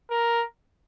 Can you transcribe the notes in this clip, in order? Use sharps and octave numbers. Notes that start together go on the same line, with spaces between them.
A#4